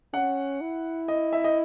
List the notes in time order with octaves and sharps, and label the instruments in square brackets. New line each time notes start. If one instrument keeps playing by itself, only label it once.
[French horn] C#4 [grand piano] F#5
[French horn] E4
[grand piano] D#5
E5
D#5